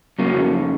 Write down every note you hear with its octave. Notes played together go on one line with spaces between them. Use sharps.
F2 C#3 F#3 A#3